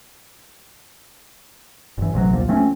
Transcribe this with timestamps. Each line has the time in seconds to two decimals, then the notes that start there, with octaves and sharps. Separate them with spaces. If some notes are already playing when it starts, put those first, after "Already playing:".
1.98 G1 E3
2.14 A1 C3 E3 F#3
2.33 A#1 D#2 F3 A#3
2.48 F3 A3 C4 C#4